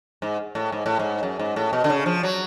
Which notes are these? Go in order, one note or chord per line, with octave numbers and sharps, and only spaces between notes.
G#2
A2
G#2
A2
G#2
F#2
G#2
A2
B2
D3
C#3
F3
F#3